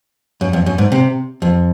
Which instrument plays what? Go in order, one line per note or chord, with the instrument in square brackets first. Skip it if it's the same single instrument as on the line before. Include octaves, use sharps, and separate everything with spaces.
[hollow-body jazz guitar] F#2
F2
F#2
G#2
C3
F2